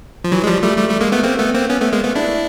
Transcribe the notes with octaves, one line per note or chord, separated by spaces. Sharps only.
F3
E3 F#3
G#3
F3 G3
G3 A3
G3 A3
G3 A3
G#3 A#3
A3 B3
A#3 C4
A3 B3
A#3 C4
B3 C#4
A3 B3
G#3 A#3
A3 B3
D4 E4